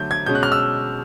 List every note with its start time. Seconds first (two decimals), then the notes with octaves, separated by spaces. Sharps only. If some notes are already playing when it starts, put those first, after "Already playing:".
Already playing: D3 F#3 A3 G6
0.11 G#6
0.26 B2 G#3 C#4 G6
0.35 F#6
0.43 F6
0.52 E6